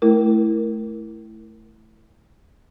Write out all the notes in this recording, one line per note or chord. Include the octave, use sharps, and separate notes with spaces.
A3 E4 A#4